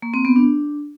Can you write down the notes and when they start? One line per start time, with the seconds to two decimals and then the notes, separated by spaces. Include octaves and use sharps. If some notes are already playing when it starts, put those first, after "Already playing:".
0.02 A#3
0.14 C4
0.25 B3
0.36 D4